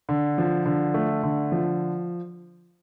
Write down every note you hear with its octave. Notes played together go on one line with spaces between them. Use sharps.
D3
F3
D3
A3
D3
F3